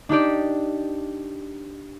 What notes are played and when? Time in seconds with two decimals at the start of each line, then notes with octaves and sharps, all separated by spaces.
0.09 D4 D#4 G4 D5